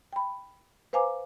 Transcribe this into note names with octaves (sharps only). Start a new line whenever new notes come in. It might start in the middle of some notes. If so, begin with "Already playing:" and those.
G5 B5
B4 C5 F5 G#5 A#5 D6